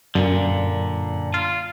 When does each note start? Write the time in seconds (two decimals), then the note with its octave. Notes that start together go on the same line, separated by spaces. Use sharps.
0.15 F#2 A#2 D3
1.34 F4